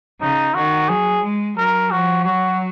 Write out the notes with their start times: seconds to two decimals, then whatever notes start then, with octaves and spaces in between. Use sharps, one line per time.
0.21 C#3 D#4
0.55 D#3 F#4
0.88 F#3 G#4
1.23 G#3
1.57 F#3 A#4
1.91 F3 F#4
2.25 F#3 F#4